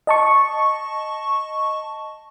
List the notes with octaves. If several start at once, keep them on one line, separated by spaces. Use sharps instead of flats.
D#5 A5 C#6